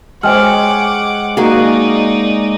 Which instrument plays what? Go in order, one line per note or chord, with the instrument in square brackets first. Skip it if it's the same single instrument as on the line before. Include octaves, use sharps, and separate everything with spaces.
[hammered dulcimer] G#3 C#5 [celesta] C5 G5 F6 [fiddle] F#5 D6
[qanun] A#3 F#4 G#4 [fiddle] D#4 D5